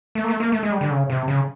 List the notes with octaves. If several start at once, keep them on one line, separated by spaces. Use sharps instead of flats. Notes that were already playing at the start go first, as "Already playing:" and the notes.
A3
A#3
A3
A#3
A3
G#3
G3
D3
C#3
C3
C#3